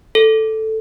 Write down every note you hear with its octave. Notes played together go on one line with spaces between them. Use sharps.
A4